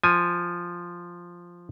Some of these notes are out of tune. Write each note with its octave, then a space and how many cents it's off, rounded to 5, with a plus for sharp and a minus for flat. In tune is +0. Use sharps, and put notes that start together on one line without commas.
F3 +0 G#5 +0